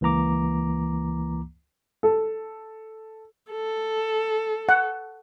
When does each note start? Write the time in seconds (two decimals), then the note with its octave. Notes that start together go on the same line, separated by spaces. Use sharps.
0.01 C#2 E3 A#3 A#5 D6
2.03 A4
3.52 A4
4.69 F#5